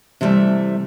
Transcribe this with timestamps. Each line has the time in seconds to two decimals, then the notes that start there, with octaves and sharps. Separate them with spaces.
0.21 C3 E3 F#3 G3 A3